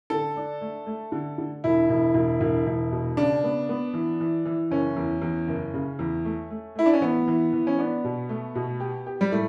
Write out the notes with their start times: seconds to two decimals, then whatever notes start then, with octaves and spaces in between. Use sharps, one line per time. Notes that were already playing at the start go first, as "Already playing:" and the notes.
0.10 D3 A4
0.36 D4
0.61 A3
0.86 A3
1.12 D3
1.38 D3
1.64 E1 E4
1.89 E1
2.14 E1
2.41 E1
2.67 E1
2.92 B2
3.17 C#3 D4
3.44 B3
3.69 B3
3.94 E3
4.20 E3
4.45 E3
4.71 F#1 C#4
4.97 E2
5.22 E2
5.48 F#1
5.74 C#3
5.99 E2
6.25 A3
6.50 A3
6.75 A3 E4
6.86 D4
6.94 C#4
7.01 E3 B3
7.28 E3
7.53 E3
7.67 C#4
7.78 B3 D4
8.04 B2
8.29 A3
8.55 B2
8.80 G4
9.06 G4
9.21 G3
9.32 A2 A3